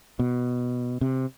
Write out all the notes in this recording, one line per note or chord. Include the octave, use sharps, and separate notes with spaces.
B2
C3